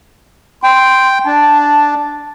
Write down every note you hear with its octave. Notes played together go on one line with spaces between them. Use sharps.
G5 C6
D4 A5